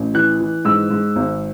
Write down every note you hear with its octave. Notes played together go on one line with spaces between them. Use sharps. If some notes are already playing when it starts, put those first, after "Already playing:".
Already playing: A1
E3 F#6
E3
G#2 E6
G#2
G#1